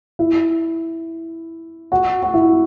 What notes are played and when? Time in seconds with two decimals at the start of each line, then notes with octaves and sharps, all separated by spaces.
0.19 E4
1.92 F#4
2.23 F#4
2.34 E4